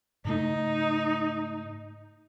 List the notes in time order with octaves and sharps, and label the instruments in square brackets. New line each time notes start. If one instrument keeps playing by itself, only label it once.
[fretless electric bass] G#2 C#3 A3 [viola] D#4